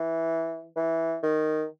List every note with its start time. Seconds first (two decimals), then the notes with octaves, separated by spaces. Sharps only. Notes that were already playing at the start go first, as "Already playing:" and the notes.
Already playing: E3
0.76 E3
1.23 D#3